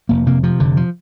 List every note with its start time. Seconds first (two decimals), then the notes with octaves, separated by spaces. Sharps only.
0.09 F1 A#3
0.26 C3 A#3
0.43 C3 F3
0.60 F1 D3
0.77 F3